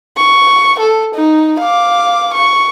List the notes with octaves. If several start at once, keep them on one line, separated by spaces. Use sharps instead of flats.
C#6
A4
D#4
F5 D6
C#6